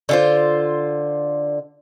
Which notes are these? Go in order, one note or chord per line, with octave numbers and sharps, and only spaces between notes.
D3 F4 C5